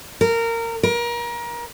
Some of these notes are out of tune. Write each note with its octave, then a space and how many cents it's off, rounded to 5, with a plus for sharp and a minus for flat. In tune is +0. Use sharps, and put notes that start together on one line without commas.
A#4 -20
A#4 +30